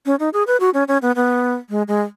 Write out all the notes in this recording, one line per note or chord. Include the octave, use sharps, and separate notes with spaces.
C#4
D#4
G#4
B4
F#4
C#4
C#4
B3
B3
G#3
G#3